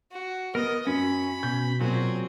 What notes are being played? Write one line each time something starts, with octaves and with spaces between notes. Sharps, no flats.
F#4
B3 A#4 D#5 D#6
F#2 C#4 B5
B2 G6
A#2 F#3 C4 G#4